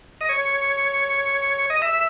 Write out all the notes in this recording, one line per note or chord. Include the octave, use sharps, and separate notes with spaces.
D#5
C#5
D#5
E5